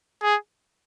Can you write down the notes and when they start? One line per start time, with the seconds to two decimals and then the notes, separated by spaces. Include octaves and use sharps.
0.22 G#4